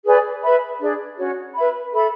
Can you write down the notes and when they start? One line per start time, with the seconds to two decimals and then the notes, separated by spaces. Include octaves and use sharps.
0.04 G#4 B4 D5 G#5
0.42 B4 E5 B5
0.80 D4 G#4 D5
1.18 C#4 F#4 C#5
1.56 B4 E5 B5
1.93 A4 E5 B5